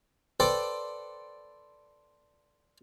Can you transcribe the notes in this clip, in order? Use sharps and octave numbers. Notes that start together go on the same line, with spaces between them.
A4 B4 C5 D5 G5